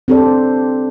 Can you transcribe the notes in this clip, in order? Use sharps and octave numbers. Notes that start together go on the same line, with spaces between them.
C4 D4 G4 A4 C5 D5